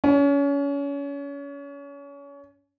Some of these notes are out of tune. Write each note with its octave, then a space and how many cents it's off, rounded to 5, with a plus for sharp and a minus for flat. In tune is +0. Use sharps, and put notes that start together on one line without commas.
C#4 +30